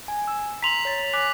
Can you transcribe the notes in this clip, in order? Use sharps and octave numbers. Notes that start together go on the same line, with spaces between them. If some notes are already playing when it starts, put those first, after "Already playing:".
G#5
E6
A#5 C6 B6 F7 F#7
C#5 A6
G#5 D6 F#6 B6